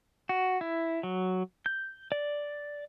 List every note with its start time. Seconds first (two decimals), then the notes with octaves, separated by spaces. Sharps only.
0.29 F#4
0.61 E4
1.03 F#3
1.66 G6
2.12 D5